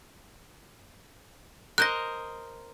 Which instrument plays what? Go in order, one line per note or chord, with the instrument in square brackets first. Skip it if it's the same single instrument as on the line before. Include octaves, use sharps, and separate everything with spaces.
[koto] A#4 C5 D#5 [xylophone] F#6 G6 A#6